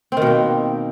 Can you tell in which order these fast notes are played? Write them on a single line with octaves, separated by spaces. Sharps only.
C4 D#3 B2 A#3